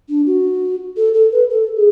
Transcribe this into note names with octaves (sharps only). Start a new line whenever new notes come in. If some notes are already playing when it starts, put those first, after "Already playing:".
D4
F#4
A4
A4
B4
A4
G#4